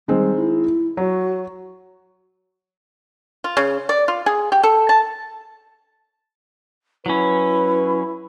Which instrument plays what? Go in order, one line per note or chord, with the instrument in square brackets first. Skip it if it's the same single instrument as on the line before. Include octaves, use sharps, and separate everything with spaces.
[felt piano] D#3 G#3 C4 [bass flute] G3
[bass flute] E4
[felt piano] F#3 [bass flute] F#4
[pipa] F4
C#3
D5
F4
G#4
G4
A4
A5
[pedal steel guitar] F#3 C#4 [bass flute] E4 [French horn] B4